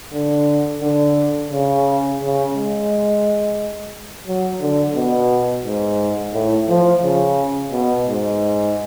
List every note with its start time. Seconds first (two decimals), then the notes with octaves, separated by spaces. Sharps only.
0.13 D3
0.81 D3
1.51 C#3
2.20 C#3
2.54 G#3
4.27 F#3
4.60 D3
4.95 B2
5.64 G#2
6.34 A2
6.69 F3
7.02 C#3
7.71 B2
8.06 G#2